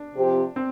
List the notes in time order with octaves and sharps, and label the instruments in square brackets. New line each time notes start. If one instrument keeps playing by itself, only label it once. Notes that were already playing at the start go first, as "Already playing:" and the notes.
Already playing: [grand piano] D4
[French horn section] C3 F3 C4 G4 C5
[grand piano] C4